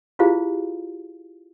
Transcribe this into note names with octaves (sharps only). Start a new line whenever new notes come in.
E4 F4 G4 G#4 C5 F5